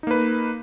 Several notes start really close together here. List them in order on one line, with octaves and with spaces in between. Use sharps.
D#4 A#3 B4